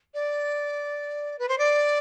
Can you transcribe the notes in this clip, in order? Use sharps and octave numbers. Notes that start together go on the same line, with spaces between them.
D5
B4
C5
D5